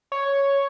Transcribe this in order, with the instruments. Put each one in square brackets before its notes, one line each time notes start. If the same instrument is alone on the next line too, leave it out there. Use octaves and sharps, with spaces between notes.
[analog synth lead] C#5